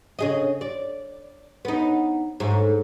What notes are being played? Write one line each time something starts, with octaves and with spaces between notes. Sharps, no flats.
C#3 G#4 D#5
D5
B3 D#4
G#2 A3